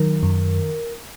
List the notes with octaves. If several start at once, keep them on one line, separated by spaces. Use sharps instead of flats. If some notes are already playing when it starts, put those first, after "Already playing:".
Already playing: D#3 F#3 A#4
F#2